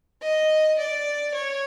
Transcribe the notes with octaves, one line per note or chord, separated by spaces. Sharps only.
D#5
D5
C#5